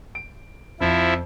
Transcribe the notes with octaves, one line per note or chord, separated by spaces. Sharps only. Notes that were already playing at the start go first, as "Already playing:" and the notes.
D7
F2 F3 E4